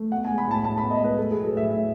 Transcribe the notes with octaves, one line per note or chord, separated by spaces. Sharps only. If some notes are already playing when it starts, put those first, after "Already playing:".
Already playing: A3
B3 F#5
G#5
G#3
B5
A2 A5
A2 A5
B3 B5
D#5
G#3 B4
A3 A4
G#4
F#3
A4
A2 E5
A2 E5